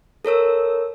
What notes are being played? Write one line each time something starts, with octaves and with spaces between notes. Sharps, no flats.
A4 A#4 C#5 E6